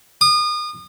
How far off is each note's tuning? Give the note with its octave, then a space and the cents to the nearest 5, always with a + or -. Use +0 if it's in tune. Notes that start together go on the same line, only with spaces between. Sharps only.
D#6 -35